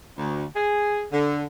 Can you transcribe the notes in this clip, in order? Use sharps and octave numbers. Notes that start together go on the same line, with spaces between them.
D2
G#4
D3